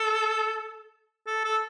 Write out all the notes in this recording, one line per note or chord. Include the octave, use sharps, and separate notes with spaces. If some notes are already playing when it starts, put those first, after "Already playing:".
Already playing: A4
A4
A4